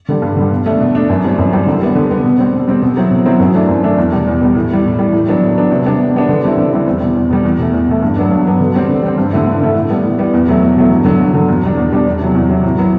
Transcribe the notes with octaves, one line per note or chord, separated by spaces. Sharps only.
D3 G3
G2
D3 G3
B2
A3 D4
B2
A3 D4
F#2
E3 G3 C4
F#2
E3 G3 C4
D3
G3 B3
D3
G3 B3
B2
G3 C4
B2
G3 C4
B2
F#3 C4 E4
B2
F#3 C4 E4
F#2
E3 A3 D4
F#2
E3 A3 D4
E2
B2 G3
E2
B2 G3
A2
E3 G3
A2
E3 G3
A2
F#3 B3 D4
A2
F#3 B3 D4
C3
G3 B3 D4
C3
G3 B3 D4
D3
G3 C4 E4
D3
G3 C4 E4
E2
B2 G3
E2
B2 G3
E2
B2 A3
E2
B2 A3
G2
F#3 B3 D4
G2
F#3 B3 D4
D3
G3 C4
D3
G3 C4
G2
D3 A3 E4
G2
D3 A3 E4
A2
G3 B3
A2
G3 B3
E2
B2 F#3 A3
E2
B2 F#3 A3
G2
D3 F#3
G2
D3 F#3
E2
B2 G3 D4
E2
B2 G3 D4
E2
C3 F#3
E2
C3 F#3
A2
F#3 B3